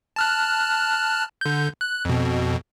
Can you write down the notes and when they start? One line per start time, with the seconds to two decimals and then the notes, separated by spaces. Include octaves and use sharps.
0.16 A5 F6 F#6
1.41 D3 G6
1.81 F#6
2.05 F2 B2